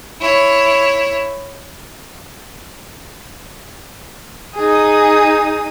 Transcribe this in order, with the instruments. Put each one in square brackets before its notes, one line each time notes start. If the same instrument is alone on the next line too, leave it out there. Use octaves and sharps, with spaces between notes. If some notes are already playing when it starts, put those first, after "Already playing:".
[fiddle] E4 C#5
[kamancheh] D#4 D#6 [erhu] G#4